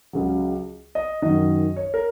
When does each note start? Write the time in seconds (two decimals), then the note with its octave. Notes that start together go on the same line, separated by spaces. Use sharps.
0.13 C#2 C#3 F#3
0.95 D#5
1.22 F#2 D#3 F#3 D#5
1.76 C#5
1.94 A#4